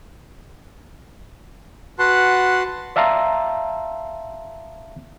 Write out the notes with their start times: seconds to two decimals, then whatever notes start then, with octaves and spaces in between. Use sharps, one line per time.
1.99 F#4 B4 F#5 A5 C6
2.96 D5 E5 F5 A5 A#5 C6